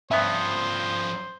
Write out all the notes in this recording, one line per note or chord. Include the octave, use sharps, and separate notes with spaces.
G2 F3 B3 C#4 C5 E5